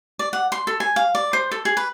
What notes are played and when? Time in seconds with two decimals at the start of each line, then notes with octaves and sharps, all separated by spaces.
0.19 D5
0.33 F#5
0.52 C6
0.67 A4
0.80 G#5
0.96 F5
1.15 D5
1.33 C5
1.51 A4
1.65 G#4
1.77 B4